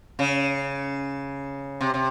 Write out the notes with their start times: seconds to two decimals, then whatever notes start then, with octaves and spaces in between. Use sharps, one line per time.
0.19 C#3
1.81 C3
1.94 C3